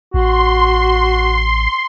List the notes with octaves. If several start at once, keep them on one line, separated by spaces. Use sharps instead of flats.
A1 F#4 C6